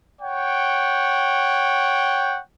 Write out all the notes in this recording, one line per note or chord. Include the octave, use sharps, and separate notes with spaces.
C#5 F#5 G5